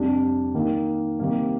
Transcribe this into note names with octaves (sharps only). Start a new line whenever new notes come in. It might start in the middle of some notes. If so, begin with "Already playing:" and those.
Already playing: F2 C3 G3 D4
D#3 A#3 D#4
C3 D#3 G3 A#3